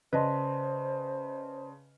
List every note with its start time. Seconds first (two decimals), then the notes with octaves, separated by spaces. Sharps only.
0.13 C#3 B4 C5 D5 D#5 A5 C6